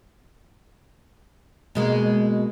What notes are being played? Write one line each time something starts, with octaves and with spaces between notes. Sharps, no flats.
B2 G#3 A#3